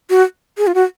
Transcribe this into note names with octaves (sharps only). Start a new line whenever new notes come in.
F#4
G#4
F4
F#4